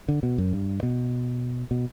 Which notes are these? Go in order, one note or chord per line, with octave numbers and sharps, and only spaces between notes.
D3
B2
F#2
G2
B2
B2